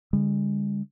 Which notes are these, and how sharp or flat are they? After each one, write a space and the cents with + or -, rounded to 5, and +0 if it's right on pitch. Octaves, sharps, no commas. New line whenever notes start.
D3 -25 G#3 -45